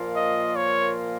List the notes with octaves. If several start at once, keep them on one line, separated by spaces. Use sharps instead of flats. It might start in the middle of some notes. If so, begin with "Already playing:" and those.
Already playing: A#2 F3 A#3 F4
D#5
C#5